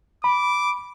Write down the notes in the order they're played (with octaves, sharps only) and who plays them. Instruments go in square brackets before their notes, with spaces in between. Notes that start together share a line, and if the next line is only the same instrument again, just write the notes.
[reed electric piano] B5 [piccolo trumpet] D6